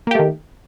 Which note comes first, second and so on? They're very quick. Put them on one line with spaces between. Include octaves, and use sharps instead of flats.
A#3 G4 A3 D#3